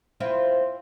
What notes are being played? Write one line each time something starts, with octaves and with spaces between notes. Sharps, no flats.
C4 E4 F4